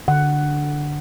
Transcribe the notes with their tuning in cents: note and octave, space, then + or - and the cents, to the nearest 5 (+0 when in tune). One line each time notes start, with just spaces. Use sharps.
D3 +0 F#5 +10